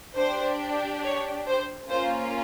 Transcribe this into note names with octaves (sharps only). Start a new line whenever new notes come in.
D4 G4 C5
C#5
C5
A#3 C#4 F4 C5